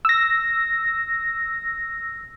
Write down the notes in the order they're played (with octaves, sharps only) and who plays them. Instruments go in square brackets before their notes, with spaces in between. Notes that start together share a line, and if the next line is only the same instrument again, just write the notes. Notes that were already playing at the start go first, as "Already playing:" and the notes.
[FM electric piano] E6 A#6